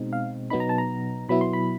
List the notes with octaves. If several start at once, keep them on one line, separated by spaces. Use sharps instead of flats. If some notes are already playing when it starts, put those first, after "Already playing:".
Already playing: B2 G#3 C4 D#4
F5
B2 F#3 B3 D#4 B5
A#5
A5
A#5
B2 F#3 B3 E4 B5
C6
B5